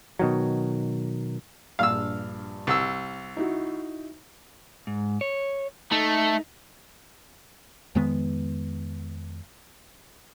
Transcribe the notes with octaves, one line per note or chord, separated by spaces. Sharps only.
B2 D#3 F#3
A#1 G2 F5 E6
C2 E6
D#4 E4 F#4
G#2
C#5
A3 D#4
F2 D#3 G#3 B3